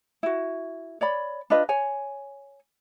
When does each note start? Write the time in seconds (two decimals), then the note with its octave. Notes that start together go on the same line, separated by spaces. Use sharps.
0.23 E4 F#4
1.01 C#5 D5 B5
1.50 D4 F4 B4 D#5
1.69 C#5 G#5